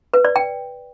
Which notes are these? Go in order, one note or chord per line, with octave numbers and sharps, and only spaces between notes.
B4
D5
G5